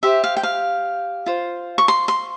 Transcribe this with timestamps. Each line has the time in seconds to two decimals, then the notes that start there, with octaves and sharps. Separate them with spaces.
0.03 G4 C5 E5
0.24 F5
0.37 G5
0.43 F5
1.26 F4 C5
1.78 C#6
1.88 C6
2.08 C6